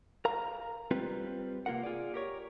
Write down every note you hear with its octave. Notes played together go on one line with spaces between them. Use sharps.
A#4 F5 A#5
G3 C4 F4 B4
C3 A#3 F4 A#4 F#5
F4 G#4 D5
G4 A#4 C#5